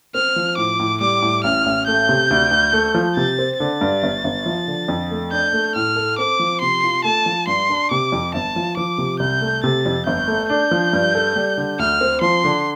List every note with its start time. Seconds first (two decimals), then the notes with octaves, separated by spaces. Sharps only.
0.14 C4 F6
0.36 F3
0.57 A2 D6
0.80 A2
1.01 G3 D6
1.22 A2
1.44 A1 F6
1.66 A1
1.87 A3 G6
2.09 C3
2.31 D2
2.51 D2
2.73 A3
2.95 F3
3.16 C3 A6
3.39 C4
3.59 D3 A6
3.81 G2
4.03 G1
4.24 G1
4.46 F3
4.68 D3
4.88 F2
5.11 A3
5.32 D4 G6
5.53 A3
5.75 A2 F6
5.96 A4
6.18 C4 D6
6.39 F3
6.61 C3 C6
6.84 F4
7.04 A3 A5
7.26 F3
7.47 G2 C6
7.69 D4
7.91 C3 D6
8.12 F2
8.34 G1 A5
8.56 F3
8.77 F3 D6
8.98 C3
9.20 C2 G6
9.41 A3
9.64 C3 A6
9.85 F2
10.06 G1 G6
10.27 A3
10.49 D4 G6
10.71 F3
10.93 G2
11.15 A4
11.36 G3
11.58 D3
11.79 D2 F6
12.01 C4
12.21 F3 C6
12.44 D3